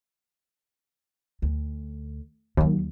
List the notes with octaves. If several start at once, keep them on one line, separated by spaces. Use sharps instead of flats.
D2
D#2 D#3 F#3